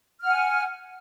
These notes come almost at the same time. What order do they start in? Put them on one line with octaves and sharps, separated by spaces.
F6 F#5 G#5